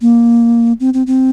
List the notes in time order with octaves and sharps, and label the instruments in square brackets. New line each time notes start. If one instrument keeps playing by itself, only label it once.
[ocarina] A#3
C4
C4
C4